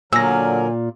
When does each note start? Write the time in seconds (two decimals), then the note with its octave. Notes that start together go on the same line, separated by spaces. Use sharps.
0.13 A#2 D3 F#3 A#4 G#5 E6 A#6